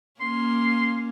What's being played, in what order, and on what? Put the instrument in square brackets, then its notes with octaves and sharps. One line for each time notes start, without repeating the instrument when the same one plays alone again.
[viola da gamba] A#3 C#4 [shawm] C6